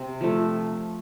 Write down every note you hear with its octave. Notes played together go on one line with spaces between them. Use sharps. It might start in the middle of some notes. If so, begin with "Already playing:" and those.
Already playing: C3
F3 A3